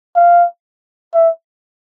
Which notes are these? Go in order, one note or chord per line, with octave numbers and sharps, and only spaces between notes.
F5
E5